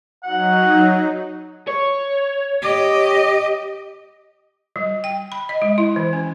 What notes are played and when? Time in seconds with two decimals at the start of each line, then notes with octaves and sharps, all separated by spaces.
0.23 F#3 D#4 F#5
1.68 C#5
2.61 G4 D#5
4.76 G3
5.04 G5
5.32 B5
5.49 D#5
5.62 G#3
5.78 E4
5.96 E3
6.13 C#4